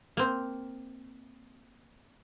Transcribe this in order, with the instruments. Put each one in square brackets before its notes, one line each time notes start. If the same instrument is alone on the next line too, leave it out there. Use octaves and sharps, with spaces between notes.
[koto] A#3 C4